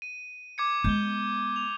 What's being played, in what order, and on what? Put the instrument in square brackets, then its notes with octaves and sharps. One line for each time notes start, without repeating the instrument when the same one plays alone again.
[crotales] D#7
D6 G#6 C#7
[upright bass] G#3 B3 [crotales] G6 G7
[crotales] F7